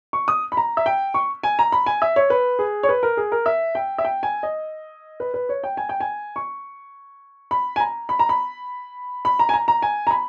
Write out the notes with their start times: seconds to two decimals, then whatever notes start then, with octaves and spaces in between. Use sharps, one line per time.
0.13 C#6
0.28 D#6
0.52 B5
0.57 A#5
0.77 E5
0.86 G5
1.14 C#6
1.43 G#5
1.59 A#5
1.72 B5
1.86 G#5
2.02 E5
2.16 C#5
2.30 B4
2.59 G#4
2.83 C#5
2.89 B4
3.03 A#4
3.17 G#4
3.32 A#4
3.46 E5
3.75 G5
3.98 E5
4.05 G5
4.23 G#5
4.43 D#5
5.20 B4
5.34 B4
5.49 C#5
5.64 G5
5.77 G#5
5.89 G5
6.00 G#5
6.36 C#6
7.51 B5
7.76 G#5
7.80 A#5
8.09 B5
8.19 A#5
8.29 B5
9.25 B5
9.39 A#5
9.49 G#5
9.54 A#5
9.68 A#5
9.82 G#5
10.07 A#5
10.11 B5